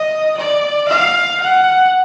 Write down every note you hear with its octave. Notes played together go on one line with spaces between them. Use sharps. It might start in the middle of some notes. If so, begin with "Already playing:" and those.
Already playing: D#5
D5
F5
F#5